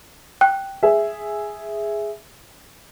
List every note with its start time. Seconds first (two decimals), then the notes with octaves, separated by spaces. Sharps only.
0.41 G5 F#6
0.83 G#4 E5